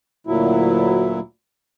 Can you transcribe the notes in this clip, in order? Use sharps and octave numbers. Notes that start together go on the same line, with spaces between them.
D2 A#2 F#3 E4